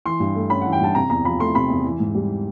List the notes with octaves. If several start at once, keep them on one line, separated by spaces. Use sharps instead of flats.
E3 C6
G2
A3
C#4 B5
E3 F#5
G5
G2 A5
C3 A#5
E2 A#5
F3 B5
A3 C6
C3 B5
E2
E3
G#2
G3